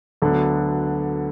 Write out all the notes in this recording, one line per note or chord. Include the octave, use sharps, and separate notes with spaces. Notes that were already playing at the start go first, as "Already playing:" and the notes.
D2 D3 F#3 B3 D4